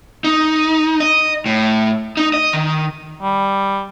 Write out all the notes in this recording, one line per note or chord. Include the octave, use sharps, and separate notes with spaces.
D#4
D#5
A2
D#4
D#5
D#3
G3